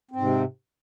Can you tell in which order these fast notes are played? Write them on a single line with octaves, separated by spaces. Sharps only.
C4 G#2 C3